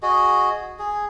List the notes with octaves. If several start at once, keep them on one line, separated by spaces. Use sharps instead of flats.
F#4 G#4 D#5
G#4